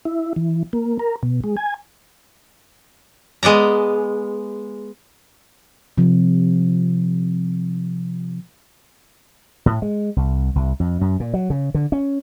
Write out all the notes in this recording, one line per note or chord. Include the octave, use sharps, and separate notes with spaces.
E4
E3
A#3
A#4
B2
G#3
G#5
G#3 B3 D5 A#5
C3 F3
A2
G#3
C2
C2
F2
F#2
A#2
F#3
C#3
D3
C#4